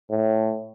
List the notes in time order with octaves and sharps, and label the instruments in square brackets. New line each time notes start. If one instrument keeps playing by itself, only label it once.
[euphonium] A2